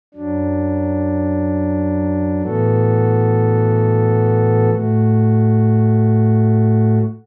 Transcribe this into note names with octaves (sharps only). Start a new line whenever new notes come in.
F#2 F#3 D4
A2 E3 B3 F#4 A4
A2 A3 F#4